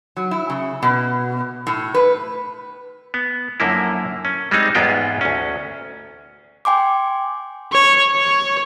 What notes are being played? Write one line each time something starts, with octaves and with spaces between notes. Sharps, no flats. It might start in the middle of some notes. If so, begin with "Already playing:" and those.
F#3
E4
C#3
B2
A2
B4
B3
F#2 D3 F3 A#3 E4
C#4
G3 G#3 C4 D#4
E2 G#2 G#3 B3 F4 G5
D2 C#4
G5 G#5 C6 D6
C#5
C#5